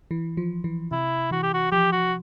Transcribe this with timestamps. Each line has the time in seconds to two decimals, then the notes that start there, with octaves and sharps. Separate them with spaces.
0.11 E3
0.37 F3
0.64 E3
0.91 C3 E4
1.31 E3 F#4
1.43 G4
1.54 F#4
1.72 F3 G4
1.92 F#4